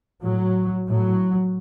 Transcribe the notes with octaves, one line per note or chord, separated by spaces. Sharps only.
A2 F#3
A2 F#3